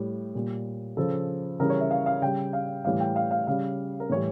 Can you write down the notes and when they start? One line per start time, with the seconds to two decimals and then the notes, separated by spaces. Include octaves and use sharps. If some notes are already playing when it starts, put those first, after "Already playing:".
Already playing: A2 G3 G4
0.34 A#2 G3
0.97 C#3 F3 A4
1.60 C#3 E3 G3 A#4
1.70 C#5
1.80 E5
1.91 F5
2.06 F5
2.22 C#3 G3 G5
2.53 F5
2.85 A2 E3 G3 F5
3.00 G5
3.16 F5
3.31 F5
3.47 C#3 G3 F5
4.00 A#4
4.09 A2 E3 G3 C#5